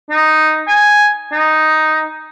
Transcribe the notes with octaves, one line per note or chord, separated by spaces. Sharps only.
D#4
G#5
D#4